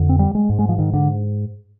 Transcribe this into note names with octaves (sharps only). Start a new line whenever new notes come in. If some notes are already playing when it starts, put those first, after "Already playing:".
Already playing: F2 D3
C4
G3
G#3
G#2
G#3
F3
D#3
D3